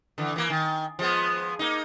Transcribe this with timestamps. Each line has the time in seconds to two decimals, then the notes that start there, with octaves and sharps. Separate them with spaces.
0.18 D3 E3
0.36 E3 A#3
0.50 D#3
0.99 F3 G#3 B3
1.59 A#3 D#4